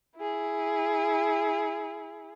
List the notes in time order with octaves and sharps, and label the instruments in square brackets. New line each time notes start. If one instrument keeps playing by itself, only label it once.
[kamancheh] E4 G#4